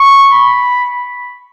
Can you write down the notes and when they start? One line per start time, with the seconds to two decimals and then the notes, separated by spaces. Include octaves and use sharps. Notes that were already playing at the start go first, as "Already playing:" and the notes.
Already playing: C#6
0.33 B5